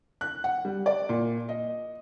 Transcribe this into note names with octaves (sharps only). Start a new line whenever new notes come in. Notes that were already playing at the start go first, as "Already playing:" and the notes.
F#6
F#5
G3
D5
A#2
D#5